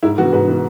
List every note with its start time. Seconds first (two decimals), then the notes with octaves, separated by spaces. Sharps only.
0.03 G#2 E4
0.18 E3 B3 F#4
0.33 G#2 B4
0.47 E3 B3